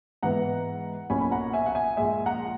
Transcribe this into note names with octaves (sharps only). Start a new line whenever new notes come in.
G#2 E3 B3 F#5 A#5
B1 A#2 A#3 C#4 G#5 B5
B5
F#5 A#5
E5 G#5
F#5
E5 G#5
A#1 A#2 G#3 E5 G#5
F#5 A#5